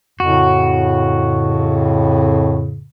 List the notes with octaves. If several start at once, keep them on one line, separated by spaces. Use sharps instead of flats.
F2 A2 C#3 F#4